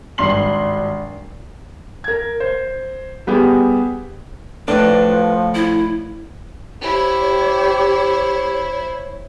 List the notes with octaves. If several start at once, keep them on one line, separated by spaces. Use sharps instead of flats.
G#1 G2 C6 C7 F#7
A#4 G#6
C5
G3 B3 G4 G#4
A2 F3 D4 B4
E4
E4 G4 C5 C#5